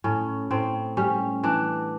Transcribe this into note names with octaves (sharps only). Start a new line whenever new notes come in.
A2 C#4
A2 C4
G3 C#4
E3 D4